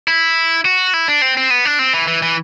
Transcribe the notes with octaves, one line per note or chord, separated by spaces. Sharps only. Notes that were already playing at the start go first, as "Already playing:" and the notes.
E4
F#4
E4
D4
C4
C4
B3
D4
C4
E3
E3
E3